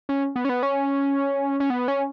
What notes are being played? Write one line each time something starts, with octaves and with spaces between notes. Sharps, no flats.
C#4
B3
C#4
B3
C#4
C#4
B3
C#4